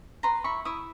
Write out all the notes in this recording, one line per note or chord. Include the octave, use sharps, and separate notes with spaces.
B4 A#5 C6
E4 B5 C#6
E4 C#6 D#6